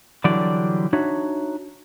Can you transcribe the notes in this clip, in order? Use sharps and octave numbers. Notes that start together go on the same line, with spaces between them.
D3 E3 F#3 G3 D4 D5
D4 D#4 F#4 C#5 E5